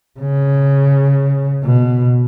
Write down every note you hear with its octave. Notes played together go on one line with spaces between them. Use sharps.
C#3
B2